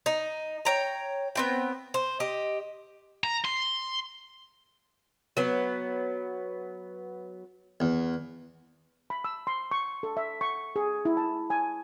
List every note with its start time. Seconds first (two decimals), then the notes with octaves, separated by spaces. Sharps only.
0.06 D#4
0.65 C#5 G5 A#5
1.35 B3 C4 G5
1.94 C5
2.20 G4 D#5
3.24 A#5
3.45 C6
5.37 F#3 B3
7.80 E2
9.10 B5
9.24 E6
9.47 C6
9.71 C#6
10.03 A4
10.17 E5
10.41 C#6
10.76 G#4
11.05 E4
11.17 A5
11.50 G#5